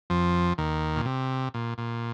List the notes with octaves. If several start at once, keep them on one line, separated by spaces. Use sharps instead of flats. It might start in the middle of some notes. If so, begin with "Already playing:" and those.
F2 F3
D#2 D#3
A#2
C3
A#2
A#2